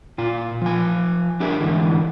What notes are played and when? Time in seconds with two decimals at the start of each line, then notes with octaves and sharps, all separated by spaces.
0.18 A#2 F4
0.62 F3 G#5
1.40 D4 G4 G#4 A#4 E5
1.60 G#2 D3 E3